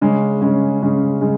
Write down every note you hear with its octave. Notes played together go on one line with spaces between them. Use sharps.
C#3 G#3 C#4
C#3 G#3 C#4
C#3 G#3 C#4
C#3 G#3